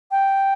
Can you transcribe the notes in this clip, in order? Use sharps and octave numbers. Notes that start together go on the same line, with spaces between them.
G5